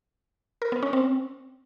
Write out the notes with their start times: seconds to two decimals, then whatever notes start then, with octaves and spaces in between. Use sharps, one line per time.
0.62 A#4
0.72 B3
0.83 C#4
0.93 C4